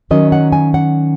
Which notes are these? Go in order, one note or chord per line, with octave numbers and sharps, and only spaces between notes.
D#3 F#3 C#4 D#5
F#5
G#5
F#5